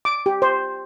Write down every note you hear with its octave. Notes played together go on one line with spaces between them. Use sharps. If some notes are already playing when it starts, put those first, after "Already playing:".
D6
G4
C5